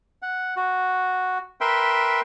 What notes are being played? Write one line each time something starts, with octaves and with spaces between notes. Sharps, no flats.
F#5
F#4
A#4 B4 E5 G5 C6